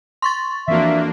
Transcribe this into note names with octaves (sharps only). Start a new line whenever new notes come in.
C6 C#6 A6
F2 E3 A#3 D4 F#4 E5